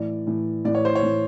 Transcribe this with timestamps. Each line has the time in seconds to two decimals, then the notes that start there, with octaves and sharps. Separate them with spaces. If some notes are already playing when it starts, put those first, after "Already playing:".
Already playing: A2 E3 D5
0.27 A2 E3
0.65 A2 E3 D5
0.75 C#5
0.85 C5
0.95 C#5
1.02 A2 E3